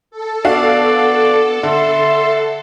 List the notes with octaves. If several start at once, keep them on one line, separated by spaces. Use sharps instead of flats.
A4
B3 D4 F#4 D5 F5
D3 E5 C6